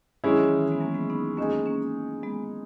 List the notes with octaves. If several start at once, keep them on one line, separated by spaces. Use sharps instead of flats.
D#3 F#3 G#3 C#4 E4 G#4
E3
D#3
E3
G#3 B3
F#3 A#3
G#3 B3
B3 D#4
G#3 A#3 C#4 D#4 G#4
A#3 C#4
G#3 B3